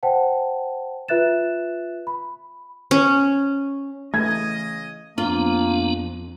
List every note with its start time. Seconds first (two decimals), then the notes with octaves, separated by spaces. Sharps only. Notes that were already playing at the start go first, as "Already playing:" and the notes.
0.03 C5 F#5 G5 A5
1.08 F4 B4 E5 F#6 A6 E7
2.07 B5
2.91 C#4
4.14 C#3 E3 A3 D#5 G#6
5.18 F2 A#3 B3 D4 F4